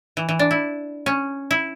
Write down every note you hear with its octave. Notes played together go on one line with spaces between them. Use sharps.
E3
E3
D4
E4
C#4
E4